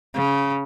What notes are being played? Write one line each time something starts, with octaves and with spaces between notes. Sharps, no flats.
C#3